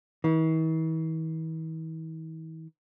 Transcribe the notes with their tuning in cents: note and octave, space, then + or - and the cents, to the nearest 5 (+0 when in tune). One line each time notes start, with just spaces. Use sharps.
E3 -45